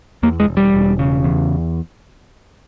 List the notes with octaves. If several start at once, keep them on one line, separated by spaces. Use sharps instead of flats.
E2 A#3
G#3
E1
G3
E1
C#3
E2